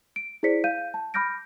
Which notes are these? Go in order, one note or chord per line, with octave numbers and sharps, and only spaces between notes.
D7
E4 G#4 C5 D5 B6 C#7
F5 G6 D#7
A5
B5 D6 F6 G6 A#6 D7